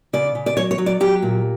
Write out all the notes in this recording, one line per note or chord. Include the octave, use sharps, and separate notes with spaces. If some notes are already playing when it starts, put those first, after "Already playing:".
C#3 D5
C#3
D5
F#3 C#5
C#5
F#3
D5
F#3 G4
A#2